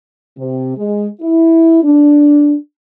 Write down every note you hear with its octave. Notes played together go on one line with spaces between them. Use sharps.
C3
G#3
E4
D4